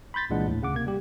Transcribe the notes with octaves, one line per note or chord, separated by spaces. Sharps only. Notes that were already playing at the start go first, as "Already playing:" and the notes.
B5 C6 G6 A6 B6
C2 A#2 E3 G#3 D4 F#5
D#2 A2
D2 C#3 F#5 D6
C3 A#3 G#6
G3 G4